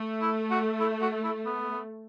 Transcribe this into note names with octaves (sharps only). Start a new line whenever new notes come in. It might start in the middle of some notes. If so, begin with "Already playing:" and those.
Already playing: A3
E4
F#4
E4
F#4
E4
B3